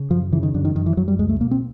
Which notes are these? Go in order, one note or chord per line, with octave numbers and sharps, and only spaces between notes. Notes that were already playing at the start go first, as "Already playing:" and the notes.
Already playing: C#3
F#2 F3
C#3 E3
D#3
F#2 D3
D#3
F#2 D#3
E3
F#2 F#3
G3
C#2 G#3
A3
B2 A#3
C4